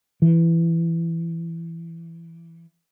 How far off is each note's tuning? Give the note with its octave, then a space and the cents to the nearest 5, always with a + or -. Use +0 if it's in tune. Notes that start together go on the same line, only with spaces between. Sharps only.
E3 +15